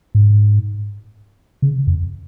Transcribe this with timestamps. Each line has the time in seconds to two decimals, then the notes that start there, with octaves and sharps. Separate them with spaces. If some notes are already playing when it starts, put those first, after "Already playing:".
0.15 G#2
1.62 C#3
1.87 F2